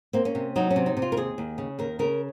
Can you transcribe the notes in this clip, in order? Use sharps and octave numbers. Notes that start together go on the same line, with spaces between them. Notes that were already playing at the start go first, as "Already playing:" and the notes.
A#3 C4
C#4
C3
F#3 D#4
C#4
C3
D#4
C3
F4
A#4
D#2 G#4
D#2
C#3
D#2 A#4
C#3 A#4